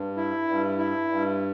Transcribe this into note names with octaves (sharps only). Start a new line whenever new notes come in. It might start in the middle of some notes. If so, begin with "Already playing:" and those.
Already playing: G2
E4
G2
E4
G2